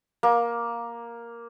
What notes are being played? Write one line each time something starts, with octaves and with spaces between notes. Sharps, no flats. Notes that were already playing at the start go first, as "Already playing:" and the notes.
A#3